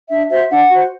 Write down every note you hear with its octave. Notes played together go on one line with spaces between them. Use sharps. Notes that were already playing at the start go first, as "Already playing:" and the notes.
D4 E5
F#4 C5 E5
D4 F#5
F#4 C5